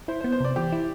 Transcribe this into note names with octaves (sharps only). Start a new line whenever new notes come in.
E4 C5
C5
B3
C5
C3 D5
E3 G4
E4